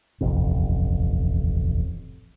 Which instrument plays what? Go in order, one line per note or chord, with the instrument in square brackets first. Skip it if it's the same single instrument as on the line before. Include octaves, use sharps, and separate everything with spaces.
[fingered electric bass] D#1 A1 F2 C3